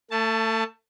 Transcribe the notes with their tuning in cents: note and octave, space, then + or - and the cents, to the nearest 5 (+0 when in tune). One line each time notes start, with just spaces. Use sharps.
A3 +30 A5 +0